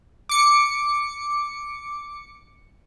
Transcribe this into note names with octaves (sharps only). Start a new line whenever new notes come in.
D6 C#7